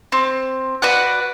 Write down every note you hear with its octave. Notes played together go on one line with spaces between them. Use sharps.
C4
F#4 B4 D5 F#5